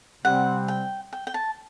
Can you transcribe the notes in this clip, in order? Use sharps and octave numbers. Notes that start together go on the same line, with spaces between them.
C3 G3 C4 F#5
G5
G5
G5
A5